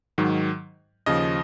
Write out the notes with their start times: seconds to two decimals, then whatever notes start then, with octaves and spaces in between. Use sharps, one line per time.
0.18 G#2 D#3 F#3
1.06 D#2 C#3 F3 D#5